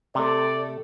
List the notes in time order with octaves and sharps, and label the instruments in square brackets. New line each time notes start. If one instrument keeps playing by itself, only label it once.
[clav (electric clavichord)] C3 [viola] A3 A4 [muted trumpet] D5